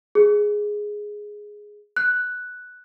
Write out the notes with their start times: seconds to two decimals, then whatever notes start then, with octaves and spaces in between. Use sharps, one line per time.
0.15 G#4
1.97 F#6